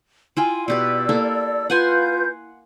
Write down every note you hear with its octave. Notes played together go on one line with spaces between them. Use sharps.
E4 F4 G5 G#5
B2 G4 B4 D5 E6
A#3 E4 A4
F4 B4 F#5 G#5 C6 G6